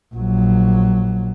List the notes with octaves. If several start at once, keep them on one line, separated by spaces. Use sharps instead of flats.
A#1 F#3